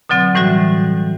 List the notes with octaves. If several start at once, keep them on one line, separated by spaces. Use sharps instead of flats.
B2 D3 F#3 C4
A2 E3 G3 F#4 E5